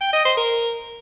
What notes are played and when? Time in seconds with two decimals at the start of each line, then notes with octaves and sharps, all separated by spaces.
0.01 G5
0.13 D#5
0.25 C5
0.37 A#4